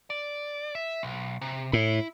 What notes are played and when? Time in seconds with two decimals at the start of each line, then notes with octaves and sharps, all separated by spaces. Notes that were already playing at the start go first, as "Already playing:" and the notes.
0.10 D5
0.75 E5
1.03 B1
1.42 C3
1.73 A2 E4